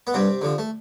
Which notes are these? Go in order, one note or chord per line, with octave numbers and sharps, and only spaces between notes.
B3
G2 C3 C4
D3 F3
A3